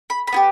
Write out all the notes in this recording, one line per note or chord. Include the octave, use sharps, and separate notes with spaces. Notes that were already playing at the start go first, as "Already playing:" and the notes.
B5
B5
B3 E4 G4